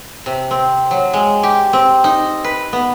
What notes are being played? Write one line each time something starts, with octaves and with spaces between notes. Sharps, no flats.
C3
C4
F#3
G#3
G4
C4
D#4
B4
B3